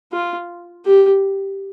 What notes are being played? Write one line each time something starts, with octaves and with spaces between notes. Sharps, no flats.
F4
G4